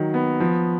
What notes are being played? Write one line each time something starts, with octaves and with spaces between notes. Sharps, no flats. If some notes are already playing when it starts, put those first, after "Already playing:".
Already playing: D#3 F#3
B3
F3